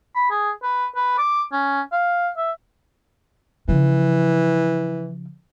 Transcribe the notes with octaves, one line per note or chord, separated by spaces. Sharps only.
B5
G#4
B4
B4
D6
C#4
F5
E5
C#3 E3 F3